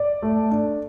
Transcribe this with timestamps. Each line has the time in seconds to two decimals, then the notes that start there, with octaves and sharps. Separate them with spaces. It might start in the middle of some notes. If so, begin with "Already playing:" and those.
Already playing: D5
0.22 A3
0.51 D4